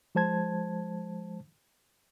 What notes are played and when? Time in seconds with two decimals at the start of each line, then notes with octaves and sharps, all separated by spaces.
0.15 F3 G#3 C5 A5 G#6